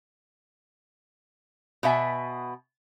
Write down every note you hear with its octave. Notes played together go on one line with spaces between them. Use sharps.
B2 B3 E5 G#5